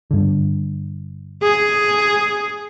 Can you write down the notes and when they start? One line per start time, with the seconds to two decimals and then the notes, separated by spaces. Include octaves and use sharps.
0.11 G2 D3
1.43 G#4